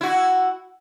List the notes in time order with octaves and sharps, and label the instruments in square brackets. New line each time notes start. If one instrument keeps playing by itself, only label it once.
[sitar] E4 F#4